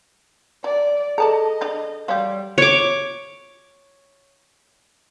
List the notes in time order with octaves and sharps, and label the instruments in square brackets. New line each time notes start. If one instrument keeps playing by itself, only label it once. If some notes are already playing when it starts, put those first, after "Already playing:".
[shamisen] F#3 [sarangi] D5
[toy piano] G#4 A4 [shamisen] D5 A5 A#5 [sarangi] D#5
[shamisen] D3 D4 D5
[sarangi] G3 [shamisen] F#4 G4 [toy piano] C#5 F5 C6
[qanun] C#5 D6